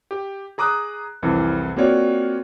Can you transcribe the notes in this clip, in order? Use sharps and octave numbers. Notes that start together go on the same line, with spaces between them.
G4
G#4 A#5 D6 D#6 F#6
C2 F2 E3
A#3 C4 F4 F#4 C#5 D5